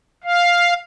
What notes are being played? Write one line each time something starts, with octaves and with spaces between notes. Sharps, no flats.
F5